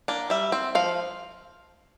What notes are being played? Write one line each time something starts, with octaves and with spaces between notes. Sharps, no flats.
A#3 D4
G3 E5
C4
F3 F5